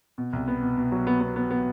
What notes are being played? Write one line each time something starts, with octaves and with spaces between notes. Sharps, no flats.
B2
C2
B3
B2
B2
F#3
B3
B3
B3
B3